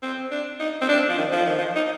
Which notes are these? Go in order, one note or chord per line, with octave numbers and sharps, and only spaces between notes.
C4
D4
D#4
C4
D4
F3
D#3
F3
D#3
F3
D#4